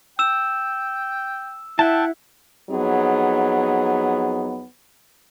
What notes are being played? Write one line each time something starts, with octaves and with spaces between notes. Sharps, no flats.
G5 E6 E7
E4 E5 F#5 G5 A5
F2 F#3 B3 D#4 G#4